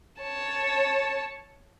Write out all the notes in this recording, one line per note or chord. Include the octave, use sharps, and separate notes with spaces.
C#5 A5